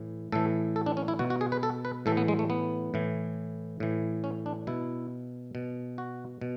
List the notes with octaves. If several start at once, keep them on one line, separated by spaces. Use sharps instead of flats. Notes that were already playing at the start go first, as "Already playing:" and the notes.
Already playing: A2 E3
A2 E3 A4
A4
D4
C#4
E4
B2 F#4
F#4
G#4
B4
A4
B4
A2 E3 A4
B3
G#3
A3
B3
A2 E3
A2 E3
C#4
D4
B2 E4
B2
F#4
B2